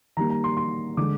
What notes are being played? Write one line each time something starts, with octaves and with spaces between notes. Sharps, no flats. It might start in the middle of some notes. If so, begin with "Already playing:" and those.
D#3 G3 A#3 A#5
A#5
C6
C6
D3 G#3 D6